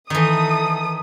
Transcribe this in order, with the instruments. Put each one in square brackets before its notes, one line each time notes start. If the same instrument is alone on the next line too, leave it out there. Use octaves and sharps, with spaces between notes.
[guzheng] D#3 E3 [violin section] A4 D#6